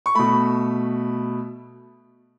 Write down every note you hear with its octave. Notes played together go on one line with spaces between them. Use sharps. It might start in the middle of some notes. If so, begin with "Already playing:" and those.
C#6
B2 A3 B5